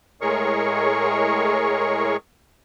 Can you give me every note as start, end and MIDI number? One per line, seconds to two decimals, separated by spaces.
0.21 2.16 45
0.21 2.16 56
0.21 2.16 68
0.21 2.16 70
0.21 2.16 73
0.21 2.16 85